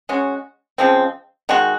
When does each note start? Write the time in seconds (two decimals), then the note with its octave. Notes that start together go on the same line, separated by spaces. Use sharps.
0.09 G#3 C#4 F#4
0.78 C#3 F3 G#3 C4
1.49 D#3 G#3 D#4 F#4